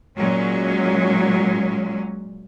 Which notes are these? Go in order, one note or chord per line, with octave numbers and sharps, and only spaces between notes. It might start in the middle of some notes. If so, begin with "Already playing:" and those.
A#2 F#3 G#3 C#4